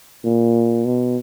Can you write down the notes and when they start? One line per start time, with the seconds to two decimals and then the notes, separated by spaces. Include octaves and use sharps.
0.24 A#2
0.85 B2